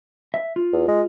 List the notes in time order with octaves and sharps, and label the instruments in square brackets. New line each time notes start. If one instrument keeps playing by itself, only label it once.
[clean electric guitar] E5
F4
[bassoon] E2
G#3